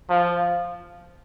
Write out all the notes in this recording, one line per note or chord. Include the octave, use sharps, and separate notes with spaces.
F3